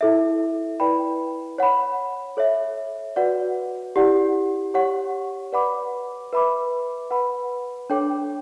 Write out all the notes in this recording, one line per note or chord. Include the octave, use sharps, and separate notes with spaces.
E4 A4 E5
E4 B4 D5 G5 B5
C#5 F#5 B5
A4 C#5 E5
F#4 B4 D5 F#5
E4 G4 D5 F#5
G4 C#5 F#5 C#6
B4 D5 F#5 B5 D6
B4 E5 B5 D6
B4 F#5 B5
D4 A4 C#5 G5 D6